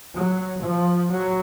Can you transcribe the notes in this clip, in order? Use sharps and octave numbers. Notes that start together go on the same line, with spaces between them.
F#3
F3
F#3